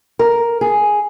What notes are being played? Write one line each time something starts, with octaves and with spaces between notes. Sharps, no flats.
A#4
G#4